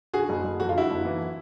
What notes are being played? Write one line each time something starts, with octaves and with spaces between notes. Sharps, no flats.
D3 F#4 G#4
F#1
F#1
F2 F#4
F4
D3 E4 F#4
F#1
E3